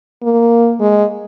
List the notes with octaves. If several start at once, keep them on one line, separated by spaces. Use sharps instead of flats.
A#3
G#3